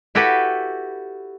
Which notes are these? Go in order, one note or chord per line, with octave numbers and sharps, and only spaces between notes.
E4 F#4 G4 A4 B4